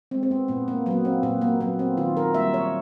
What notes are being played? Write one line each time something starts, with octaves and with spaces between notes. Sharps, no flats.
G#3 C4
C4
B3
A#2 B3
A#3
F#3 A#3 B3
C4
A#2 B3
A#3
F#3 A#3 B3
C4
D#3 F4
A#4
G3 A#3 E5
C#5